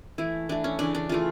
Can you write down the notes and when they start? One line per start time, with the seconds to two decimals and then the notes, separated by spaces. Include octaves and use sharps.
0.18 E3 A3 E4
0.49 E3 A3 D4
0.64 C#4
0.79 C#3 E3 A3 D4
0.95 D4
1.09 C#3 E3 A3 F4